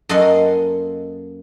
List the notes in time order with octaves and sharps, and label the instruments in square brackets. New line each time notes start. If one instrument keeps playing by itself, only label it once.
[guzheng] F#2 A#3 A4 D#5 F#5 C6